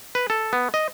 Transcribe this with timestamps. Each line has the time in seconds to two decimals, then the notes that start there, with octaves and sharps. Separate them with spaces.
0.15 B4
0.30 A4
0.53 B3
0.74 D#5